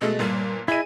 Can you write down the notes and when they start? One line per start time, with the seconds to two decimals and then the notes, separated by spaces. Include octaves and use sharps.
0.01 B2 G#3 A3 A4
0.19 G1 A#2 G3
0.68 E4 G#4 D#5 D#7